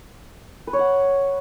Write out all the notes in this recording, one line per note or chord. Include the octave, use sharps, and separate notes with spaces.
B4
C#5
F#5